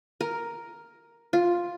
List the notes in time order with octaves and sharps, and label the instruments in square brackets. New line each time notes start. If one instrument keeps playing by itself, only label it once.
[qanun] A#4
F4